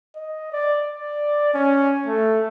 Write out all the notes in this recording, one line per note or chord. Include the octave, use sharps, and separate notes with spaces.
D#5
D5
D5
C#4
A3